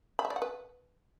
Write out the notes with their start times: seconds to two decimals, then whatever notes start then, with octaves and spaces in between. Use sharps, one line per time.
0.19 B5
0.25 E5
0.30 D5
0.36 F#5
0.42 B4